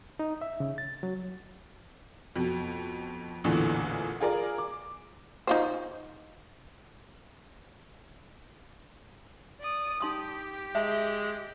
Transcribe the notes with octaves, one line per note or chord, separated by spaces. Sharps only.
D#4
E5
C#3
A6
F#3
F2 B2
A1 E2 A#2 D3 E3
F4 G#4 A#4 D5
D6
D#4 F4 C5
D5 D#6
D#4 G4 C6 D#6
G#3 E5 A5